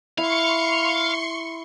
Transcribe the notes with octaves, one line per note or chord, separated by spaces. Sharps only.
E4 F5 C6 C#6 C#7